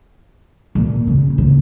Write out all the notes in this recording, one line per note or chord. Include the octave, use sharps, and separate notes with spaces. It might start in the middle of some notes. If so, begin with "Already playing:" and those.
A#2
C#3
A#2